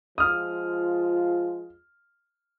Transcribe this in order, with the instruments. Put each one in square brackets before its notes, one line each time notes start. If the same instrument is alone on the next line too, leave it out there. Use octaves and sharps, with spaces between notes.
[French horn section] F3 G#3 F4 [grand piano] D#6 F6